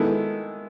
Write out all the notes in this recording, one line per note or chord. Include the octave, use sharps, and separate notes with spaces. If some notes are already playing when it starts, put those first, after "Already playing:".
Already playing: D#3 G#3 B3 E4 A4